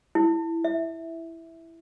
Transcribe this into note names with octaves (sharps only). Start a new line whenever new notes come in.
E4
E5